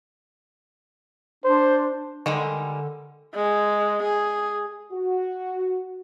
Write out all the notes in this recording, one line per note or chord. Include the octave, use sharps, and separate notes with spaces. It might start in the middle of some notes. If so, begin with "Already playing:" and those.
D4 C5
D3 D#3 G3 G#3
G#3
G#4
F#4